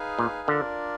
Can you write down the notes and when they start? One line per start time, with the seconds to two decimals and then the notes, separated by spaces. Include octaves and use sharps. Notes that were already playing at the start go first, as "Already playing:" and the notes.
Already playing: D#4 G#4 B4 F5 G#5
0.19 A#2
0.48 D3 D4 F4 A#4 D5